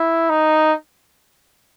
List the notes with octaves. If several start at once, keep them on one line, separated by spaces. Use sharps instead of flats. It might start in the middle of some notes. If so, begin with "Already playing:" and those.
Already playing: E4
D#4